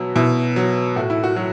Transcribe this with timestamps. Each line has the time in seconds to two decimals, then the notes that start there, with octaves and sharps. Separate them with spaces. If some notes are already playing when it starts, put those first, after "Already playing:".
Already playing: B2 F#3 E4
0.16 B2 E4
0.56 F#3
0.96 A2 F#4
1.10 E4
1.24 F#4
1.36 F#3